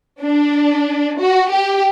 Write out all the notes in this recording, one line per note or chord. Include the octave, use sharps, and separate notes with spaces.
D4
F#4
G4